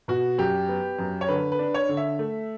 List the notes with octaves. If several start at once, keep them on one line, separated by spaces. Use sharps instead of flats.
B2 F#4
F#2 G4
B3
F#2
C#5
D3 B4
B4
D4
C#5
D3
E5
A3